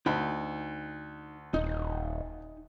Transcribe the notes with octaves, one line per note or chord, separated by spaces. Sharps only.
D2 D#4 B5
D#1 D#4